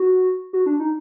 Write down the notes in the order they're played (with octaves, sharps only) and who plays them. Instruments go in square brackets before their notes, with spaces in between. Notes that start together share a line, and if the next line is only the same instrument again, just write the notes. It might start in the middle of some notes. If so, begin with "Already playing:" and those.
Already playing: [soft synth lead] F#4
F#4
D4
D#4